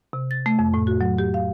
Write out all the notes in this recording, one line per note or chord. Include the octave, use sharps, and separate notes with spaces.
C3
A6
A3
F2
A2
F#4
F#3
G4
F5